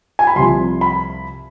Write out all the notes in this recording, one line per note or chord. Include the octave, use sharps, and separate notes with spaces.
G#5
B5
C2 C3 F3 C6
B5